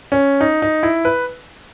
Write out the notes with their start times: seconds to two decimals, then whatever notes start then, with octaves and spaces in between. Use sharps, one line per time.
0.12 C#4
0.41 D#4
0.62 D#4
0.83 E4
1.05 B4